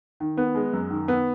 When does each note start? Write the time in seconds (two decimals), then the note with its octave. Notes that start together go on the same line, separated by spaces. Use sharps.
0.20 D#3
0.37 B3
0.55 G#3
0.73 F#2
0.90 D#3
1.08 B3